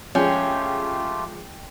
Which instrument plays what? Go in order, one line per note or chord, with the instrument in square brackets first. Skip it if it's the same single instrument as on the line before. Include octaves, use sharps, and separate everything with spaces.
[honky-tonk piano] F3 G#3 [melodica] A3 F4 G4 [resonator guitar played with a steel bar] C#4 [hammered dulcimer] G5